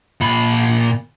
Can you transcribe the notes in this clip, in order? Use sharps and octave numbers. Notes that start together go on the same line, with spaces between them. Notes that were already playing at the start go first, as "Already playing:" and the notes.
A#2 B5